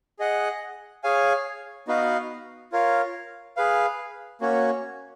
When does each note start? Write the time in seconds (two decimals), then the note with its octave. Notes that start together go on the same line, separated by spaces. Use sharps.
0.19 G#4 D#5 F#5
1.03 G#4 C#5 F5 G#5
1.88 B3 D#4 F#4 B4 F5
2.72 F4 A#4 C#5 F5
3.57 G#4 B4 F5
4.41 A#3 C#4 F#4 C#5